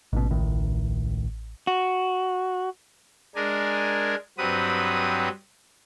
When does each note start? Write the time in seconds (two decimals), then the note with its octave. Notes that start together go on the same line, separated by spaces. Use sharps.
0.13 A1 G#2 B2
0.30 C#2 A2 D#3
1.67 F#4
3.35 G#3 D4 A#4 G#5
4.38 G2 F#3 C4 B4 D#6